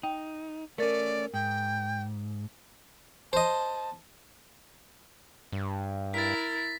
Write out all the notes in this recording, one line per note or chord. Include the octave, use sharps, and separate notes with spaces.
D#4 G5
A3 C#4 A#4 D5 A6
G#2 G5
C5 D#5 A5
G2
E4 A#4 A6 B6